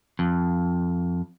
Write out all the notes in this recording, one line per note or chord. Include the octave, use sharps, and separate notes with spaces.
F2